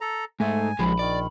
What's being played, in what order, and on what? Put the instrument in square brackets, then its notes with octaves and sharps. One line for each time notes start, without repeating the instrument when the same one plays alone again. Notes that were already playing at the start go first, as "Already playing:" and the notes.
[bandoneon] A4 A#5
[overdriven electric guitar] G#2 [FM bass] A3 [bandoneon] G#5
[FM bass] A#1 [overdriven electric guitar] F3 G#3 [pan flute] B5
[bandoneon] D#3 [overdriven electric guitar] D5